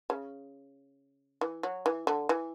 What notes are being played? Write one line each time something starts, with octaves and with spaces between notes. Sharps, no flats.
C#3
E3
F#3
E3
D3
E3